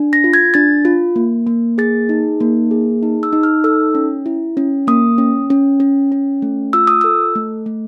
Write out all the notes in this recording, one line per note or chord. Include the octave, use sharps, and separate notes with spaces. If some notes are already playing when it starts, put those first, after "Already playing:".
Already playing: D4
A#6
F4
G#6
D4 A6
F4
A#3
A#3
G#4 A6
D#4
A#3
G#4
D#4
E6
D#4
F6
A4 E6
C#4
E4
C#4
A#3 D#6
C#4
C#4
C#4
C#4
A3
F4 E6
D#6
A4 E6
A3
A3